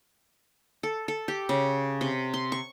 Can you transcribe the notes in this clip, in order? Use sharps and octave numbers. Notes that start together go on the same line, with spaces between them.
A4
A4
G4
C#3
C3
C6
C#6